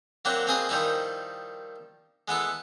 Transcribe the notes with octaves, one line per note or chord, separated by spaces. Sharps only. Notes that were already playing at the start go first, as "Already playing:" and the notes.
F#3 A#3 C4 D4 F#4 G4
A#3 C4 G#4 B4 D#5
D#3 F3 G3 D#4 E4
G#3 B3 E4 A4